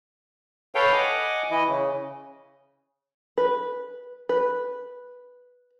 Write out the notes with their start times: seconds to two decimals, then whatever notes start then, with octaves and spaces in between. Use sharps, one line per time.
0.75 A4 B4 C#5 F5 G5
0.93 D#5 F#5 G#5 D6
1.51 E3 E4 D#5
1.67 C#3
3.38 B4
4.29 B4